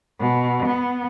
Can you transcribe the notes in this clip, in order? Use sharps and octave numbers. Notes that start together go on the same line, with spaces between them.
B2
B3